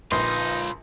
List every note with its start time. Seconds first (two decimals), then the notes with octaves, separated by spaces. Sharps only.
0.12 A#1 D#4 F4 B4 C6